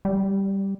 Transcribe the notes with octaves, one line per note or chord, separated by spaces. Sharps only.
G3